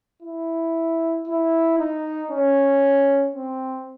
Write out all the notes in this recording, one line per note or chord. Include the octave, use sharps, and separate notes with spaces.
E4
E4
D#4
C#4
C4